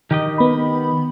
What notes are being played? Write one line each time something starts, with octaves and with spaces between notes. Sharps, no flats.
D#3 G4 D#5
B3 B5